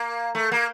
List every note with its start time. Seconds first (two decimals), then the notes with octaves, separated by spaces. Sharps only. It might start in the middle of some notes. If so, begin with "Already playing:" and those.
Already playing: A#3
0.35 A3
0.52 A#3